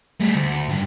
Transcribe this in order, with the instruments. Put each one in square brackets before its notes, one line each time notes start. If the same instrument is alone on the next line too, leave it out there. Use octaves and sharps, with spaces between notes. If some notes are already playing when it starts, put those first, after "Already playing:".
[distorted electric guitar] G3 A3
D2
G2